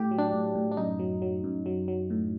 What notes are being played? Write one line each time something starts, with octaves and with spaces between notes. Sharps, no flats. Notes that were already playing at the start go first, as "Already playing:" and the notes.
Already playing: A2 G4
F#3
D4
A2
A2
D4
F#2 D#4
F#3
F#3
F#2
F#3
F#3
A2